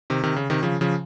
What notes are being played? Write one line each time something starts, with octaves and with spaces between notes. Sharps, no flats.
C3 D#3
C3 D#3
C#3
C3 D#3
C#3 F3
C#3 F3